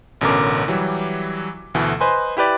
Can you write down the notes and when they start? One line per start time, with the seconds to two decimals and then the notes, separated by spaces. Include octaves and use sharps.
0.21 A1 B2 D3 C#4 A#4 D6
0.68 E3 F#3 G3
1.74 D2 B2 E3 A3
2.01 B4 C5 D#5 G#5 C6
2.37 E4 G4 B4 D5